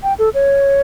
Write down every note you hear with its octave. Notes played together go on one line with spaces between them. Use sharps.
G5
A4
C#5